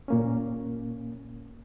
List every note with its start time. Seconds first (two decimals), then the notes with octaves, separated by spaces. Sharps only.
0.08 A#2 A#3 C#4